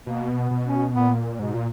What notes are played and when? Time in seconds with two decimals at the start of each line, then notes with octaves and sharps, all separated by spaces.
0.06 B2 A#3
0.36 B3
0.51 B2
0.65 C#4
0.95 A#2 B3
1.39 G#2 B2
1.53 A#2